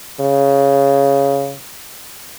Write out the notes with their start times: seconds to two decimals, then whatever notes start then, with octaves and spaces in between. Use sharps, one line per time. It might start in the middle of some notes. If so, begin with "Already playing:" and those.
0.20 C#3